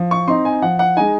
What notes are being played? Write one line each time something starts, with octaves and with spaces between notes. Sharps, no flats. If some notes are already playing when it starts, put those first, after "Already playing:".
Already playing: F3
C#6
C4 D#4 C6
G#5
F3 F#5
F#5
G#3 D#4 G#5